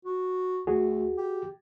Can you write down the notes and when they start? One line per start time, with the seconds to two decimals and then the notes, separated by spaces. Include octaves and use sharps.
0.05 F#4
0.67 D2 F#4 G#4
1.17 G4